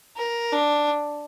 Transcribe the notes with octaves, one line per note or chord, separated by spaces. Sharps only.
A#4
D4